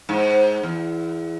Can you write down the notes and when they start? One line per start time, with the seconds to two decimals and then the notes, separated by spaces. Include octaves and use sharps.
0.09 G#2
0.63 E2